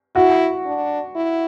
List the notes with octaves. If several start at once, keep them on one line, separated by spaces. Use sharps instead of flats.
E4 F#4
D4
E4